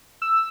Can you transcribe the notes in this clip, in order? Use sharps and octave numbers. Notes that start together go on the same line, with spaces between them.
E6